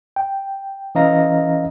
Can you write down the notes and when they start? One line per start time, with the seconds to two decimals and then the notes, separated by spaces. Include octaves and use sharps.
0.16 G5
0.95 E3 C#4 D#5 F5 A#5 A#6